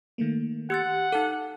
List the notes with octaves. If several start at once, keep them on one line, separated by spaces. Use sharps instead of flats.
D#3 A3 A#3
G4 F#5 E6 A6
D#4 A4 F5 A5